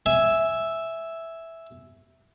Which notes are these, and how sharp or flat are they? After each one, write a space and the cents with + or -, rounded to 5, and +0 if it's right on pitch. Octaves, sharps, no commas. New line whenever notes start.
E5 +0 G#5 +0